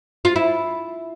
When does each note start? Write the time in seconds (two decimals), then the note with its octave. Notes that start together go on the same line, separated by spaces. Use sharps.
0.25 F4
0.36 E4